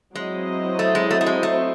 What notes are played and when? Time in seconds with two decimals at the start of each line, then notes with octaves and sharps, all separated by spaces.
0.14 F#3 G#3 C4 E4 C5 D#5
0.79 A3
0.95 G#3
1.11 A3
1.21 A3
1.26 G#3
1.43 A3